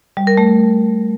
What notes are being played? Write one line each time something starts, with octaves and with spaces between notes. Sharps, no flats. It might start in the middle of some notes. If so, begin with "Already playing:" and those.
G3
A#4
A3